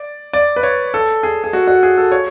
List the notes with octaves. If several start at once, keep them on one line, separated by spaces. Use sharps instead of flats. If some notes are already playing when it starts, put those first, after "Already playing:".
Already playing: D5
D5
B4
C#5
A4
G#4
G#4
F#4
F#4
G#4
A4
C#5